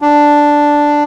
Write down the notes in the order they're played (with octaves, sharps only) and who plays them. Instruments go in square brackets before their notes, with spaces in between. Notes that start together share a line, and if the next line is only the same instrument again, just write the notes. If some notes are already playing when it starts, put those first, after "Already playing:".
[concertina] D4